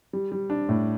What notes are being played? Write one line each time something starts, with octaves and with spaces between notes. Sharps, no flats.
G3
G3
D4
A2